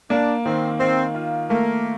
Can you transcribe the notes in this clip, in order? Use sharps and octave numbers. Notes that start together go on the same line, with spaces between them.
A#3 D4
D#3 C4
D#3 C4
F4
A3 A#3